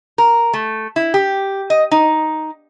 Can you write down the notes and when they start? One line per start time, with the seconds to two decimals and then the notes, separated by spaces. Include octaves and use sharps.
0.18 A#4
0.53 A3
0.96 E4
1.14 G4
1.70 D#5
1.91 D#4